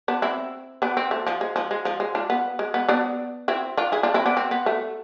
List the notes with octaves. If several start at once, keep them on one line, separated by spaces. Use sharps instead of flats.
B3 D4
C4 E4
B3 D4
C4
A3
F3
G#3
F3
G#3
F3
G#3
D4 F4
B3
G#3
B3
B3 D4
C4 E4
D4 F4
E4 G#4
D4 F4
C4 E4
B3 D4
C4
B3
A3